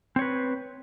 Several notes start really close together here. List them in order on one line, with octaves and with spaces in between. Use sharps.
C4 C#5 B4